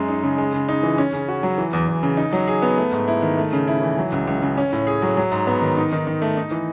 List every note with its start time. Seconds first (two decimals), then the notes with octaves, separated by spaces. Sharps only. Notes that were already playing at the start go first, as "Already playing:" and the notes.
Already playing: F#2 G#3
0.08 D#4
0.23 C#3
0.38 G#3
0.54 C#3
0.69 D#4
0.83 E3
0.98 C#4
1.13 C#3
1.28 F#4
1.43 F#3
1.58 E3
1.73 E2
1.88 E2
2.03 C#3
2.17 D#4
2.33 F#3
2.48 G#4
2.62 B3
2.77 A3
2.92 G#2
3.08 E4
3.22 D#3
3.37 A3
3.53 C#3
3.67 E4
3.82 E3
3.98 F#3
4.12 C#2
4.27 C#2
4.42 C#3
4.58 C#4
4.73 A2
4.87 G#4
5.02 F#3
5.17 F#3
5.32 G#2
5.47 B3
5.62 D#3
5.77 D#4
5.92 D#3
6.07 D#3
6.22 A3
6.37 D#4
6.51 E3